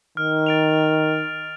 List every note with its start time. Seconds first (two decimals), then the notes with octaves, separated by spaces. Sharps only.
0.17 D#3 F6
0.46 A6 D7 F7